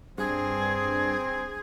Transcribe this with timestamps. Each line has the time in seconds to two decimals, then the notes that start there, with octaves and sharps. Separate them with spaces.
0.18 G2 C4 G#4